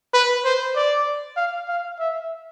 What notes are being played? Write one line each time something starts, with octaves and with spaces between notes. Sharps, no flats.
B4
C5
D5
F5
F5
E5